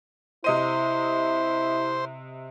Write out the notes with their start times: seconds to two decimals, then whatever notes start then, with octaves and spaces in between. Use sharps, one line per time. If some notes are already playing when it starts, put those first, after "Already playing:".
0.44 C3 E4 C5 D#5 D#7